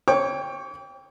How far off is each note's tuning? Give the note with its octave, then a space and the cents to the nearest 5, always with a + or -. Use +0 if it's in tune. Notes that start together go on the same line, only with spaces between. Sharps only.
C#5 -10 G5 +15 D6 -45